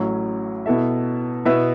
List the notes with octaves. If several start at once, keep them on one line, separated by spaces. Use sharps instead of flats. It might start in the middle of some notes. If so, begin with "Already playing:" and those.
Already playing: A1 A2 F#3 C#4 E4
B2 B3 E4 A4 E5
B2 B3 E4 B4 E5